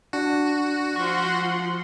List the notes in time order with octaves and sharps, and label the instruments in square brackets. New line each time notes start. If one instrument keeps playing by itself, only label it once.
[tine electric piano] D4 [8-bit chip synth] F#4
[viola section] F3 F#5 C6 [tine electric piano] C#6